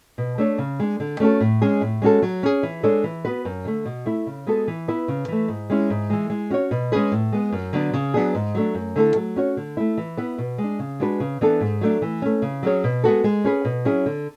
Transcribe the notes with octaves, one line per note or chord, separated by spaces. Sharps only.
B2
A3 D4 A4 C#5
C#3
G#3 D4
D3
A3 C#4 F#4 A4
A2
G#3 C#4 G#4
A2
G#3 C#4 F#4 A4
F#3
C#4 G#4
E3
G#3 D4 A4 C#5
E3
B3 F#4 B4
F#2
D3 A3
B2
A3 E4
C#3
G#3 B3 F#4 A4
E3
B3 E4 B4
C#3
E3 A3
G#2
G#3 C#4 E4
G#2
E3 G#3
G#3
C#4 F#4 C#5
B2
G#3 C#4 G#4 B4
A2
G#3 B3
F#2
D3 F#3 B3 D4
C#3
F#3 B3 D4 G#4
G#2
F#3 A3 D4
F#2
D3 A3 E4 A4
F#3
C#4 F#4 C#5
D3
A3 E4
E3
B3 E4 B4
B2
G#3
D4
C#3
G#3 D4 F#4 B4
C#3
E3 B3 D4 A4
G#2
F#3 A3 D4
E3
A3 C#4
C#3
F#3 C#4 G#4 C#5
B2
G#3 B3 F#4 A4
G#3
C#4 G#4 B4
B2
F#3 C#4 E4 G#4
D3